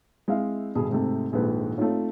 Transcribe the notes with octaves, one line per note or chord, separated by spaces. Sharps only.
G#3 C4 E4 E5 F5
G2 B2 D3 G#4
G#2 C3 A3
D#1 A#1 G#2 B4
A3 C4 D#4 F4 C#5